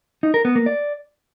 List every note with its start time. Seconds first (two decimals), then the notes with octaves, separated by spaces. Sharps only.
0.23 D#4
0.34 A#4
0.45 B3
0.56 A#3
0.66 D5